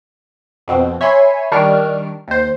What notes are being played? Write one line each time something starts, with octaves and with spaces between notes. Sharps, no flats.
F2 B2 C4
C#5 E5 G#5 B5 C6
D#3 G3 D4 C#6 F6 D7
D#2 C5